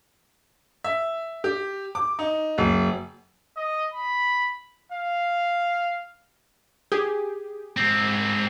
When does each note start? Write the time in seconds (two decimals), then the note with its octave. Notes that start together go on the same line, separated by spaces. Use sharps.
0.84 E5
1.44 G4
1.95 D6
2.19 D#4
2.58 F#1
3.57 D#5
3.94 B5
4.92 F5
6.92 G4 G#4
7.77 G#2 C4